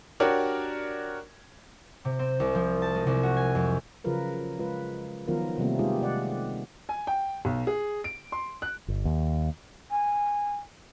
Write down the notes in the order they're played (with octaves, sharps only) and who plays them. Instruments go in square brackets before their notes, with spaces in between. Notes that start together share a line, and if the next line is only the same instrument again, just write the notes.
[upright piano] D4 F#4 G4 A#4 C#5 D5
[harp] C3
C4
C2
F3
A5
G#3
C2
F#4
G#5
F2
[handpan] C#3 F3 F#3 F4 A#4 B4
G#3 F4 B4
D#3 F3 F#3 B3 F4 A#4
C3 D#3 G3 A3 A#3 C4
G3 G#3 D#4 F4 G4 G#4
C3 D5 F#5
[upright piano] G#5
G5
B1
G#4
D7
C6
F#6
[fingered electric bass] G1
D#2
[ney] G#5